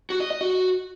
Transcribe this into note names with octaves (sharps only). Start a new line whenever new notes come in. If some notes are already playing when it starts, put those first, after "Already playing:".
F#4
D#5
D#5
F#4